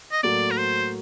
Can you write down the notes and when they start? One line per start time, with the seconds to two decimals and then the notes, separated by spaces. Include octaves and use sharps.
0.12 D#5
0.23 A2 F#3 A#3 F#4 A4 D5
0.51 A#4
0.58 C5